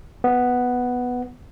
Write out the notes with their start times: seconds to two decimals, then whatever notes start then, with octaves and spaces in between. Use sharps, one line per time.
0.24 B3